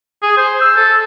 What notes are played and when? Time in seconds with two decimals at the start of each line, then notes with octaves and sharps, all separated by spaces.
0.22 G#4
0.37 C5
0.61 E6
0.76 A4